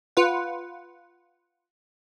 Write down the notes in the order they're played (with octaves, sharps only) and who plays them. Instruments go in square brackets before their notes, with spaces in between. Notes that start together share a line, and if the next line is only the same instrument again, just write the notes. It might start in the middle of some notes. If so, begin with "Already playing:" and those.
[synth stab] F4 B4 F#5